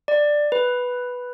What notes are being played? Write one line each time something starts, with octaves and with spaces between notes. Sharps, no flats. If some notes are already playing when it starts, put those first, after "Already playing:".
D5
B4